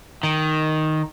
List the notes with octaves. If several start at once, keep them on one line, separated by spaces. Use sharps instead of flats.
D#3